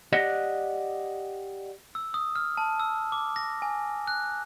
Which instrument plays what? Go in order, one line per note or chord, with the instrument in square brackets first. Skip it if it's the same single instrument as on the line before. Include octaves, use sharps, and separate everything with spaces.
[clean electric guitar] G4 D5 D#5 F#5
[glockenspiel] E6
D#6
F6
A5
E6
D6
A#6
G#5
F#6